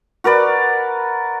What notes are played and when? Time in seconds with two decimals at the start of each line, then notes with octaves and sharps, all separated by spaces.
0.24 F#4 A#4 B4 D5